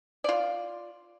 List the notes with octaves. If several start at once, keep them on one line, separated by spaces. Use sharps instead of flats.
F4 D5